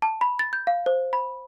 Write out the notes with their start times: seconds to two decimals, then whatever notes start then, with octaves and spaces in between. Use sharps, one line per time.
0.02 A5
0.21 B5
0.39 A6
0.53 G6
0.67 F5
0.86 C5
1.13 B5